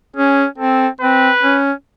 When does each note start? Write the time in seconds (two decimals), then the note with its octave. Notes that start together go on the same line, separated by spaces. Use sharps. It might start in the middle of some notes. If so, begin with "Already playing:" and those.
0.16 C#4 G#4
0.58 C4 A4
1.01 C4 B4
1.43 C#4